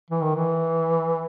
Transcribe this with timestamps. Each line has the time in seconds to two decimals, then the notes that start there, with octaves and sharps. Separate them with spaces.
0.11 E3
0.22 D#3
0.35 E3